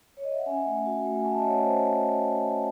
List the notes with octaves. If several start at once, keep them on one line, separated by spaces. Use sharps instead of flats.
C#5
D#5
E5
F#5
C#4 E5 G#5
A3
F#4
A3
G#5
C#4 F#5 A5
E5
D#5 F#5
A3 C#5
C5 D#5